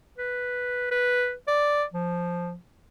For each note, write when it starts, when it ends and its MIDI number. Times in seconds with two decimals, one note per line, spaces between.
0.18 0.91 71
0.91 1.33 71
1.48 1.83 74
1.93 2.55 53